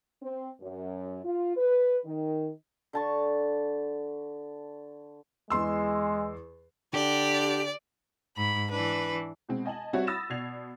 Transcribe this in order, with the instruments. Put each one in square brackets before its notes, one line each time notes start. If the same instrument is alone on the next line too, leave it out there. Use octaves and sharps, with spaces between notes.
[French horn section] C4
F#2
F4
B4
D#3
[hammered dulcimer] D3 A5 C#6
[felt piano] E2 C6 E6 [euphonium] G#3
[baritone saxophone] D3 [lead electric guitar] G4 [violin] D5
[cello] G#2 [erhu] B5
[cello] E3 D4 [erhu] B4
[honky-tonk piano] B2 G#3 C4
D#5 G#5 A5 F#7
G3 C4 F#4 C#5 E5 F#5
B5 D#6 E6 A6 A#6 E7
B2 D5 G#6 C7 F7